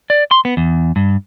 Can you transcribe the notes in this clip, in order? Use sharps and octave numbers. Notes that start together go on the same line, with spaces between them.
D5
C6
B3
E2
G2